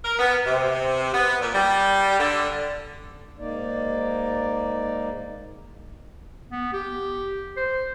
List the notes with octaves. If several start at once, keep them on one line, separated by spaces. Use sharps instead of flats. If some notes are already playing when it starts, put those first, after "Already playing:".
A#4
B3
C3
B3
A#2
G3
D3
G#2 A#3 D#4 D5
B3
G4
C5